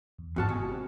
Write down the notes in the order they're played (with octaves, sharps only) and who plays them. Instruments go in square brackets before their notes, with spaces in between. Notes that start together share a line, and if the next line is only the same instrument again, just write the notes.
[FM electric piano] E2
[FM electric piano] G1 G#2 F6 [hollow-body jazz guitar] E2 F#4 A5
[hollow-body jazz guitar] B2 [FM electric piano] G#5 C#6
[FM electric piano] C4 G4